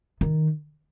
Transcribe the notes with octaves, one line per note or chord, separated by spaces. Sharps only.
D#3